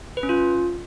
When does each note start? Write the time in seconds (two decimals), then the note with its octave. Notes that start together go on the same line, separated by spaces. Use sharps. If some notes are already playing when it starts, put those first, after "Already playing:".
0.17 B4
0.23 C#4
0.29 F4